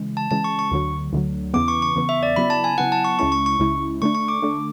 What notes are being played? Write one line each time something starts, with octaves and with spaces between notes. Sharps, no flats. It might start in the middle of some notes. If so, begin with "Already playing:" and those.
Already playing: C#3 E3 G#3
A5
C#3 E3 G#3 A5
C#6
C#6
D2 D3 F#3
D2 D3 F#3
E2 C#3 E3 B3 D6
C#6
C#6
E2 C#3 E3 B3
E5
D5
C#3 F#3 B3 E4 B5
A5
G#5
C#3 F#3 B3 E4 F#5
A5
C#6
C#2 C#3 G#3 C#4 E4 C#6
C#6
C#6
C#2 C#3 G#3 C#4 E4
D3 A3 D4 C#6
C#6
D6
D3 A3 D4